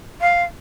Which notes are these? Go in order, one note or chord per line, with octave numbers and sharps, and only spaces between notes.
F5